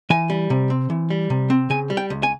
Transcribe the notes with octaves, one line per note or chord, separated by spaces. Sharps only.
E3 G#5
G3
C3
C4
E3
G3
C3
C4
C#3 G#5
G3
G5
C#2
G#5